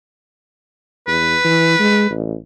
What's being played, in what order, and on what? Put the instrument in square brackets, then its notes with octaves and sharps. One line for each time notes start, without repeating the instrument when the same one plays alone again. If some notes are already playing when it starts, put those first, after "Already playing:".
[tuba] E2 [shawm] B4
[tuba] E3
G#3
A1